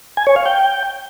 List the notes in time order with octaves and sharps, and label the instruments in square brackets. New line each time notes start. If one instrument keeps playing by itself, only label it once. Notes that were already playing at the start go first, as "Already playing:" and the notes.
[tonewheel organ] G#5
C#5
F5
G5